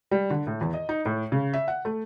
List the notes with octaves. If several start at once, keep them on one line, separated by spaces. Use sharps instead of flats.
G3
D3
A2
E2
D#5
D#4
A2
C#3
E5
F#5
A3